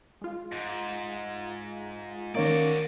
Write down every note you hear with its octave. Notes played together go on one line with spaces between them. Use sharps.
G#3 F4
G#2
D#3 A#3 C#4 D#4 F#4 D5